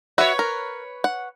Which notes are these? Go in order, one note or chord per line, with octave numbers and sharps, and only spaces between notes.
F#4 B4 C#5 E5
A#4
F#5